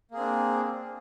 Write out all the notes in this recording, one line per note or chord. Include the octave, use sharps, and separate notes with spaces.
A#3 C4 D4 G#4